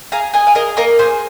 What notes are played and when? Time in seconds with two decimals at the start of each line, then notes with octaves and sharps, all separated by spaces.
0.12 G#4 F5 A#5
0.34 G#4 D#5 G#5
0.47 F5
0.55 G#4 A#4 D#5
0.77 A#3 A#4 D#5
0.99 G#4 C5